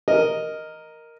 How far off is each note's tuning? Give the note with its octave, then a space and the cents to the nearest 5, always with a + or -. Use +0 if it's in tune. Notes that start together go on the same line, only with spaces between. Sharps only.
A#4 +0 D#5 +0